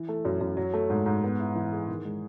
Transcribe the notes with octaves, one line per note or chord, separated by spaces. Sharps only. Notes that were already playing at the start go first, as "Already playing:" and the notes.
Already playing: E3
A3
F#2
F#2
F#3
A3
G#2
G#2
B3
E4
E3
G#4
D#3
G#3